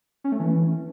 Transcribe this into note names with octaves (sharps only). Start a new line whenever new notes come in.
C#4
A3
E3